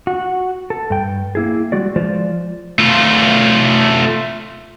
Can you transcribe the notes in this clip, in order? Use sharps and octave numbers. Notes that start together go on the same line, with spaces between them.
F#4
A4
G2 G5
A#3 E4 G#4
G3 G#3 F#4 D5
F3 G#3 F4 C5 D5
A3 F4